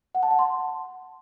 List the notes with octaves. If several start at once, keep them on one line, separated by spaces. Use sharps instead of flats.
F#5
A5
F#5
C6